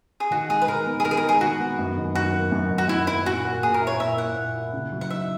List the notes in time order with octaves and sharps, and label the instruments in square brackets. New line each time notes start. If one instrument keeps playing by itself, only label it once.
[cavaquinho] G#4
[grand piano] D#3 [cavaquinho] F#4
[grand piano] G#3 [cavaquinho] G#4
[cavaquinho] B4
[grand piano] D#3 [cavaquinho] A#4
[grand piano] B3
[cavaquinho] G#4
[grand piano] D#3 [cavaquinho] A#4
[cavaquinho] G#4
A#4
[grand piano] G#3 [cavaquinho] G#4
[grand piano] D#3 [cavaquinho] F#4
[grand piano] B3
F#2
D#3
[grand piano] F#2 [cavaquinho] F#4
[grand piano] A#3
F#2
D#3
[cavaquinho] F#4
[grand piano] F#2 [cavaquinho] E4
[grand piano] A#3 [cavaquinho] E4
[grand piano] A#2 [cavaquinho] F#4
[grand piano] A#3
[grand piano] A#2 [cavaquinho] G#4
[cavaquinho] A#4
[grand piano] E4
[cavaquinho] C#5
[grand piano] A#2 [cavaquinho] E5
[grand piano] A#3 [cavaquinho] F#5
[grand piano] A#2
E4
C#3
F#3
[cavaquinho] F#5
[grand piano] D#4 [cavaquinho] E5